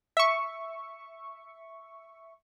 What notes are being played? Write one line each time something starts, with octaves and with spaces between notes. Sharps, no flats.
E5 C#6